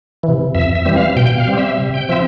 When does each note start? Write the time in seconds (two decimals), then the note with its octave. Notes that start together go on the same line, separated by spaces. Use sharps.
0.23 E3
0.29 C3
0.55 F2 E5
0.75 E5
0.85 E3 G3 C4
0.96 F5
1.16 B2 G5
1.37 F5
1.47 G3 C4
1.58 E5
1.78 C3
1.94 G5
2.09 F3 C4 E5